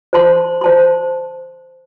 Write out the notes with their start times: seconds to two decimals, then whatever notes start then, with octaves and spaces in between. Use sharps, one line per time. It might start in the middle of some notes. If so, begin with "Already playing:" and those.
0.13 C5 A5 C6
0.61 C5 A5 C6